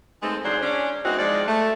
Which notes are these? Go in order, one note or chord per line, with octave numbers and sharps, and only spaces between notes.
G#3 A3 B3 C4 D#4 A4
G#2 E3 F#3 D4 G#4 C5
C#4 D4
G#3 B3 C4 D#4 E4 F#4
F3 G#3 D#4 D5
A3